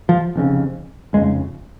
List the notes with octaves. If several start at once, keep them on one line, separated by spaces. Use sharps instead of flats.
F3
F1 F2 C#3
F1 F2 C#3 G#3